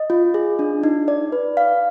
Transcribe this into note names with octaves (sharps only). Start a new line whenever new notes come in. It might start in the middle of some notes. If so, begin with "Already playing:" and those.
Already playing: D#5
F4
G#4
D4
D#4
D5
B4
F5